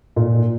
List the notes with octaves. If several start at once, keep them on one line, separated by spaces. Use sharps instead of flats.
A#2